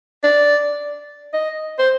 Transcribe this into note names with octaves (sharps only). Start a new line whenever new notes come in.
D5
D#5
C5